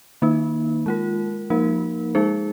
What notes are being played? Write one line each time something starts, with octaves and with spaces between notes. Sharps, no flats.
D#3 A#3 D#4
G#3 F4 A#4
F3 A#3 D#4 A#4
G#3 D#4 G#4 C5